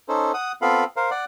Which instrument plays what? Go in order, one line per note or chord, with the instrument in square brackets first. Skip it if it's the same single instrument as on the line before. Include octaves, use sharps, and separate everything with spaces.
[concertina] C#4 D#4 A4 C5
F#5 D#6
B3 C4 F4 A4 F5 B5
A#4 C5 F5
D5 F#5